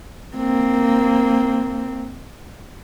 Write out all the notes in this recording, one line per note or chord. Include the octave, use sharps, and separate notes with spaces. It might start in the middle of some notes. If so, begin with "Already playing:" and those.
A#3 C4